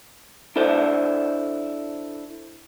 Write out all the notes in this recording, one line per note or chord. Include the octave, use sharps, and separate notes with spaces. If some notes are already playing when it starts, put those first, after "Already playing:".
D4 E4 A4 C5 D5